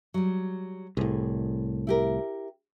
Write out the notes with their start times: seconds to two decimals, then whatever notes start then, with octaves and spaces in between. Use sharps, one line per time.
0.14 F#3 G3
0.97 C2 A2 G#4
1.87 E4 G4 A#4